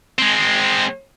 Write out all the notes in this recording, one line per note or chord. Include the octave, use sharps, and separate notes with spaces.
G#3 C4